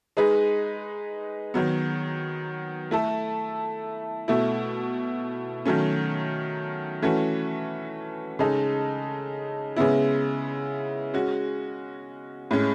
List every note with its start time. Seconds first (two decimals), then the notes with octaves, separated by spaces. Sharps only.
0.17 G#3 D#4 G#4 B4
1.54 D#3 F#3 B3
2.91 A3 E4 A4
4.28 B2 A3 E4
5.65 D#3 F#3 A3 C#4
7.02 E3 A3 C#4 F#4
8.39 C#3 G#3 D#4 A4
9.76 C#3 G#3 B3 E4
11.14 G#3 C#4 F#4
12.51 A2 G#3 C#4